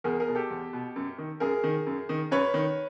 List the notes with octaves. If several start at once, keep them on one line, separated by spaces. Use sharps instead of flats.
E2 G#4 A#4
G#4 A#4
B2
G4 A4
E2
B2
F#2
D#3
F#2 G#4 A#4
D#3
F#2
D#3
F#2 B4 C#5
D#3